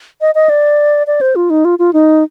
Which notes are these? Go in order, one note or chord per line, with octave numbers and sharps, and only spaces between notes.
D#5
D#5
D5
D5
C5
F4
D#4
F4
F4
D#4